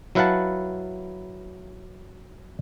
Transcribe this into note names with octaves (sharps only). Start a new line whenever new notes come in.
F#3 E4 B4 F5 F#5 A5